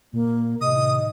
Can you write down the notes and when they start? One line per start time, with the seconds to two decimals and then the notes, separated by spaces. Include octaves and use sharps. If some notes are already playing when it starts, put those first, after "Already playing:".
0.13 A#2 A#3
0.61 A2 C3 D#3 D#5 D#6